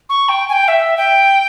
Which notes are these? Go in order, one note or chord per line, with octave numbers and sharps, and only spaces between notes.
C#6
G5
G#5
G5
E5
G5